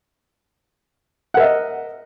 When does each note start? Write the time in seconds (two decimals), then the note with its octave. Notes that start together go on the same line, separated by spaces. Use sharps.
1.34 F#5
1.37 A#4
1.40 E5
1.42 D#5